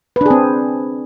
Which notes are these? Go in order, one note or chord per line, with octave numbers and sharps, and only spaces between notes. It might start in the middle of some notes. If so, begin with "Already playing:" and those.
C4 D4 G#4 B4